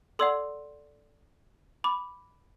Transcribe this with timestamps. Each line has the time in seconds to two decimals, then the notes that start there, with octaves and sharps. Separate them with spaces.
0.19 A4 D5 F#5 C6 E6
1.84 B5 D6